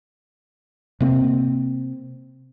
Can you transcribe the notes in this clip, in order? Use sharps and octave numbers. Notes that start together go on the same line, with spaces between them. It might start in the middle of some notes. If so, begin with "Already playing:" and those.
C3 A#3 C4